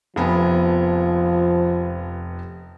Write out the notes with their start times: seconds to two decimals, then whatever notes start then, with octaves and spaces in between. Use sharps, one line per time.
0.16 F1 F3 B3 G#5